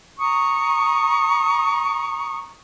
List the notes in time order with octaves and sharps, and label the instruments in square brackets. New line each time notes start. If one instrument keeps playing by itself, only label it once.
[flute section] A#5 C#6 D#6